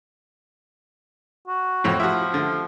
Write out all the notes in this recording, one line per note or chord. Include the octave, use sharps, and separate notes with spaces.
F#4
F2 A2
F3 E4 F#4
D3